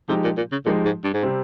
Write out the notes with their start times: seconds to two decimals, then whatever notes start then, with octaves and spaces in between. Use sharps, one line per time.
0.08 C3 F3 G#3 D#4 G4
0.24 A#2
0.37 A#2
0.52 C#3
0.65 A#2 F3 G#3 D#4 G4
0.85 G#2
1.04 G2
1.14 G#2
1.22 C3 G3 C4